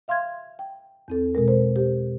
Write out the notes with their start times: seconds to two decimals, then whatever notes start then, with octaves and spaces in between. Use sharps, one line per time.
0.08 E5 F5 C6 F6 G#6
0.59 G5
1.08 E2 C4 A4
1.35 B2 G#3 A#4
1.48 C5
1.76 G4 C5